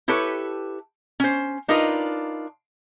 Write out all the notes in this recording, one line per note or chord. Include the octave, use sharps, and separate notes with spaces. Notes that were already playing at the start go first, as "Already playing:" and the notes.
E4 G4 A4 B4 C#5
C#4 C5
D4 D#4 F4 A#4 B4